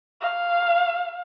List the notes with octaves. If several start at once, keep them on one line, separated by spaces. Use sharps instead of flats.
F5